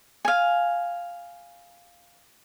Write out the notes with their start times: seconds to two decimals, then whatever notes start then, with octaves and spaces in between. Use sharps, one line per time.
0.25 F5 G#5